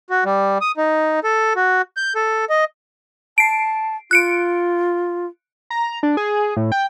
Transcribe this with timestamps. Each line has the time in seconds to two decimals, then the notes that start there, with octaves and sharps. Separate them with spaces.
0.10 F#4
0.25 G3
0.61 D#6
0.77 D#4
1.24 A4
1.56 F#4
1.97 G6
2.15 A4
2.50 D#5
3.38 A5 C7 D7
4.11 F4 F#6 C#7 D7
5.70 A#5
6.03 D4
6.17 G#4
6.56 A2
6.72 G5